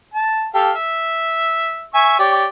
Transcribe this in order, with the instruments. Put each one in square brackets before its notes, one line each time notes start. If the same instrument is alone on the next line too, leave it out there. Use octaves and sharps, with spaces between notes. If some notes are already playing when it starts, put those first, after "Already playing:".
[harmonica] A5
G4 A4 F5
E5
E5 G#5 C#6
G4 C#5 D5